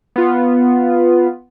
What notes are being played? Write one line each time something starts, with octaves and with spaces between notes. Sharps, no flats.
B3 F4